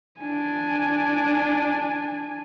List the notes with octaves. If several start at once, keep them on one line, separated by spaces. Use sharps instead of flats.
D4 G#5